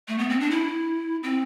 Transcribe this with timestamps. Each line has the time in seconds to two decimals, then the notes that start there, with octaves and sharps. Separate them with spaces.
0.08 A3
0.18 B3
0.29 C4
0.40 D4
0.51 E4
1.23 C4